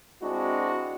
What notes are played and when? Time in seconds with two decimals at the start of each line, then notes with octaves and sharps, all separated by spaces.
0.22 G#3 C4 D4 E4 F#4